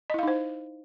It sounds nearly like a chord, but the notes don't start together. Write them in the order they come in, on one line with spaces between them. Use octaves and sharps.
D#5 E4 F5 D#4 C5